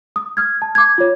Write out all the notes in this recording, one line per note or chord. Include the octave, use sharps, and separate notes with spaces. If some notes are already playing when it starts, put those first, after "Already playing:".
D#6
D#6 F6 G#6
A5
D6 G#6
F4 C#5